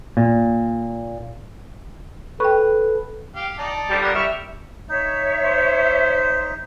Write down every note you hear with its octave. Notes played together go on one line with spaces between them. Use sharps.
A#2
A4 B4 G5 C#6
G4 F5
D#4 D5 A5
D3 F3 G3
B3 A#4
G3 E5 C#6 F6
D#4 C#5 E5
C5